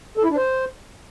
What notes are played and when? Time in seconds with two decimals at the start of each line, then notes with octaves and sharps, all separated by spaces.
0.17 A4
0.24 E4
0.30 D4
0.37 C5